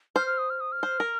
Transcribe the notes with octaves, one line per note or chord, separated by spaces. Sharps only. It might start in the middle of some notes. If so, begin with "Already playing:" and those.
C5 F6
F6
D#6
F6
D#6
F6
C5
A#4